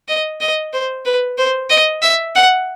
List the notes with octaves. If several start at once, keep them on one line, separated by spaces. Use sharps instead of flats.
D#5
D#5
C5
B4
C5
D#5
E5
F#5